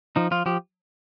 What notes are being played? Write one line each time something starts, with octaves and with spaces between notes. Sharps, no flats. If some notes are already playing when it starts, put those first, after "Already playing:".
F3 D#4
F3 F4
F3 G4